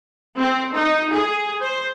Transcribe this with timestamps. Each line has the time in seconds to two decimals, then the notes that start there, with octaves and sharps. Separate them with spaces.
0.36 C4
0.71 D#4
1.11 G#4
1.61 C5